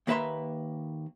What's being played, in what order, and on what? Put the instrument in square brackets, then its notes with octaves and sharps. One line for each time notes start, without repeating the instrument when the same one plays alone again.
[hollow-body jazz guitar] D#2 A#3 B4 E5 A#5 C6